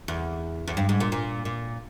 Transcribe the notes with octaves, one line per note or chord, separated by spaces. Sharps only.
E2
E2
G2
G#2
A#2
A#2
A#2